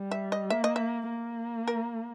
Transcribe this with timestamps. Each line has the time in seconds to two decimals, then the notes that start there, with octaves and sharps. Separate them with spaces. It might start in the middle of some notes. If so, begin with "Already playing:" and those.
Already playing: G3
0.11 E5
0.32 D#5
0.50 A#3 E5
0.64 D#5
0.76 E5
1.09 A#3
1.68 A#4